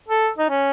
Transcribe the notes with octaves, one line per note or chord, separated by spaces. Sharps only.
A4
D#4
C#4